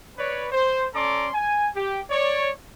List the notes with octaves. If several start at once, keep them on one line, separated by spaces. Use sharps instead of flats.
B4 C#5 D5
C5
C#4 A4 D5 A#5 C6 D6
G#5
G4
C#5 D5